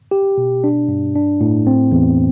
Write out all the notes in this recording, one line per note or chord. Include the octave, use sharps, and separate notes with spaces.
G4
B2
D4
G2
D4
A2
C4
E2